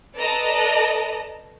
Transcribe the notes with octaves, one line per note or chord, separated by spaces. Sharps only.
A4 B4 D5 D#5 A5 A#5